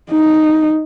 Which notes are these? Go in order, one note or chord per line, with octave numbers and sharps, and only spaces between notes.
D#4